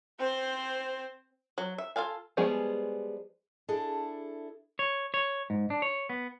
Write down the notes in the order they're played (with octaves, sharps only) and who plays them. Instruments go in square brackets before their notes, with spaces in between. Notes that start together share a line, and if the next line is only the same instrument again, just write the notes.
[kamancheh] C4 C5
[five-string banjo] F#3
E5
F4 A4 F5 G#5
F3 G3 G#3 B3 G#4
[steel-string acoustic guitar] D4 E4 G#4 A4
[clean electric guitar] C#5
C#5
G#2
D4
C#5
B3